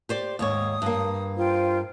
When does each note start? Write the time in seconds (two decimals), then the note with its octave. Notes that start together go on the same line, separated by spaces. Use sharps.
0.09 G4 C5 D5
0.39 D#2 G#2 C#5 D#6
0.82 G2 A#3
1.37 F4 C5 G5